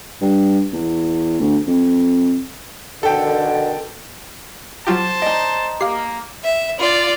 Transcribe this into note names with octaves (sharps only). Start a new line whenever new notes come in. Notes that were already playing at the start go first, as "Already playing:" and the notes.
G2
E2
D2
F2
B2 D3 D#3 A4 G5
F#3 F4 G4 C5 A5
D#4 D5 D#5
A#3 G4 F5 C7
E5
F4 D5